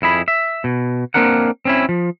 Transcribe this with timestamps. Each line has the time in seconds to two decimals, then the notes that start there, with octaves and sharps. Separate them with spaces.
0.02 F2 E4 G#4 B5
0.28 E5
0.64 B2
1.14 A#3 C4 D4 A#4 F#5
1.65 C4 C#4 E4
1.89 F3